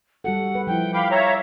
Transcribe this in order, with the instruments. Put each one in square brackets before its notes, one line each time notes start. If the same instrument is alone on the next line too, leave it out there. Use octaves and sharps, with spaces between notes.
[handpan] G3 F#4 A4 [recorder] F#5
[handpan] B4
[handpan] F3 E4 [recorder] G5
[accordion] F5 B5 D6 [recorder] G5
[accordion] C#5 E5 A#5 [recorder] F5